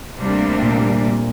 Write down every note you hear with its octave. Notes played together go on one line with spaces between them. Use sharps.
D2 C3 G3 A#3 D4
A#2